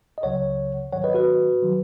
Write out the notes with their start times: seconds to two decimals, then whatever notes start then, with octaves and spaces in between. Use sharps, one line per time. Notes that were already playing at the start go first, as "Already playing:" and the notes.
0.18 D#5
0.23 C#2 C#3 F#3 C#5 F#5
0.92 G#2 D#3 F#3 C#5 F#5
1.04 B4 D#5
1.14 F#4 B4
1.62 D#3 F#3